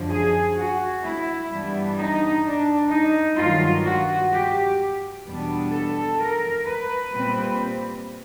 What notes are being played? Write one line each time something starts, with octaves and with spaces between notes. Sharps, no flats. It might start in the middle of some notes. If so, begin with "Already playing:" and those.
Already playing: F#2 D3 F3
G#4
F#4
E4
G2 E3 G3 B3 D4
D#4
D4
D#4
G2 D#3 F#3 F4
F#4
G4
E2 B2 G3 B3 D4
A4
A#4
B4
A#2 G3 C4